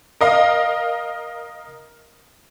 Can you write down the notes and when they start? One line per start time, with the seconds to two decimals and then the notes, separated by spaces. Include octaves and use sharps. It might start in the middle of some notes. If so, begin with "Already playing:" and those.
0.21 A#4 D#5 F5